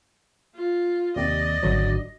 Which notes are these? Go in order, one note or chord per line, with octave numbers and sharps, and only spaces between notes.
F4
D#2 C3 D5 D#5
G#1 D3 F#3